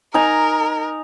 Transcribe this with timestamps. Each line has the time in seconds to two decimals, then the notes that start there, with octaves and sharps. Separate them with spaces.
0.14 D#4 A#4 G#5 A#5